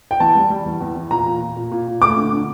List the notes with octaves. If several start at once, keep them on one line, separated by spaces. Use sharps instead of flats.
G5
E2 A5
G3
G3
E2
E2
E2
A#2 A#5
A#2
A#2
A#2
A#2
A#2
A3 D6
D3
D3